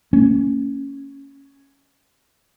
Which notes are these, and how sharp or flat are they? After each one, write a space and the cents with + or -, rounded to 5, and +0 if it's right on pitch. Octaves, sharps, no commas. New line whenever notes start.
A#3 -30 C#4 +0